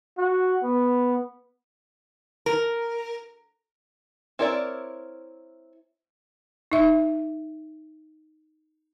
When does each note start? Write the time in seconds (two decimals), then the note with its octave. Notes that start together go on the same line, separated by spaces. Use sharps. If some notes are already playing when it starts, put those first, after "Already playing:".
0.18 F#4
0.63 B3
2.46 A#4
4.39 C4 E4 A#4 C#5 D5
6.72 D#4 E5